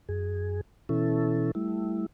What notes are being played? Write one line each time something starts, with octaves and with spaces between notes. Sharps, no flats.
F#2 G#4
B2 E3 C#4 E4 A4
G3 A3 E4